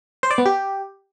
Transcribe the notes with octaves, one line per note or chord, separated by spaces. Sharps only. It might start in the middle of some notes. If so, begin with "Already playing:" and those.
C5
D5
B3
G4